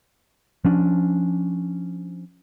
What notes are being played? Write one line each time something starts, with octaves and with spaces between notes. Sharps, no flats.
F3 C#4 D4